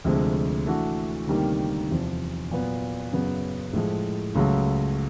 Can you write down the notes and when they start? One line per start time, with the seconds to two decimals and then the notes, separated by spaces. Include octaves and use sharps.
0.04 D2 C3 F3 G#3
0.66 E3 A3 D4 F#4
1.27 D2 C3 D#3 G3 A#3
1.89 E2 C3 F3
2.51 A#2 F#3 B3
3.12 F#2 C#3 F#3 B3
3.73 A2 F3 G#3
4.35 C#2 C#3 F#3 A3